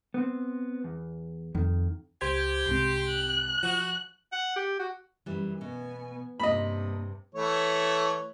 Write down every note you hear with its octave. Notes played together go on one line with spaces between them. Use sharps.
B3 C4
E2
F2 D#3
C#2 G4 C5 G#6
C2 G#2 C3 C6
F#6
F3 F#4
F#5
G4
F#4
F#2 E3 G3
B2 B3 G#5
G2 C3 A#3 D#5 B5
E3 A3 C#5